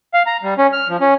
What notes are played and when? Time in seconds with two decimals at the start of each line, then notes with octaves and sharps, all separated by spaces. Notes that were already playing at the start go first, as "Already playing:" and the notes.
0.14 F5
0.27 A#5
0.43 G3
0.58 C#4
0.73 F6
0.89 F3
1.01 C#4